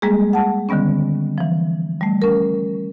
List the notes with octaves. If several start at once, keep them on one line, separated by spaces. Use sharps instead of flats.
G3 G#3 A#3 G#4
F#5 A5
D3 D#3 G3 B3 C#4
E3 F3
G3 A3
C#4 A#4